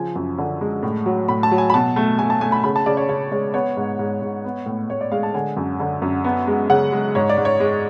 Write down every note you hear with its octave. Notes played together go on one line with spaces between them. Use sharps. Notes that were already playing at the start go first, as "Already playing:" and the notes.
Already playing: C#3 F3 G#5
F#2
D3
G#3
A2
F#3
A2 B5
A5
F#3
G#5
B5
B2 A5
A3
A3 G#5
A5
A3 G#5
B5
C#3 B5
A5
C#3 D5
C#5
C#3 C#5
G#3 C#5
B3 C#5
G#2
G#2
G#2
B3
A2
A2 C#5
D5
G#3 F5
A5
D3 G#5
F#2
D3
F#2
B3
G#3
C#3 F#5
G#3
G#2 C#5
D5
G#2
C#5
G#3